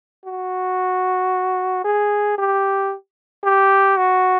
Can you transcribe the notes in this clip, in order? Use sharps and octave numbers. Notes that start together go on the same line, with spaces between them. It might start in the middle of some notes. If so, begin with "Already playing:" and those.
F#4
G#4
G4
G4
F#4